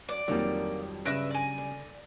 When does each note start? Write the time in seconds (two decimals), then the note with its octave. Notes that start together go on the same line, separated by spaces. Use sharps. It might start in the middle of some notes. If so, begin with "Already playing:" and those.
0.09 F#2 D5
0.28 F2 D3 D#3 F#3 G3 A#3
1.05 G2 C#3 B4 E5 E6 A#6 D7
1.31 D5 G#5
1.58 D3